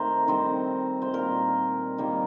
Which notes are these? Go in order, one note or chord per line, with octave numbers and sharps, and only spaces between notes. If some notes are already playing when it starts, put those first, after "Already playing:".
Already playing: D#3 A3 C4 A#4 C5
D#3 G3 C4 C5
C5
A#2 G3 A#3 A#4
D#3 G3 A#3